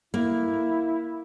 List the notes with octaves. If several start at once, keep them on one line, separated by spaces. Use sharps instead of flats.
A#3 E4